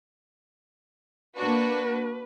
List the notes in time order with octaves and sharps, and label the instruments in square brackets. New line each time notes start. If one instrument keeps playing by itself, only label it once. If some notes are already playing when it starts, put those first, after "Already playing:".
[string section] A#3 D4 F#4 [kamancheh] B4